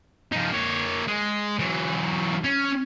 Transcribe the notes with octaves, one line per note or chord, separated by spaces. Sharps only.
F3 D#4
A#3 C#5
G#3
E3 F#3
C#4